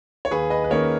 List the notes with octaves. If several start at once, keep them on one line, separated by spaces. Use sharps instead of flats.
C#5
D#2 G#4 B4
B4 D#5
B4
D#3 A#3 C#4 A#4 C#5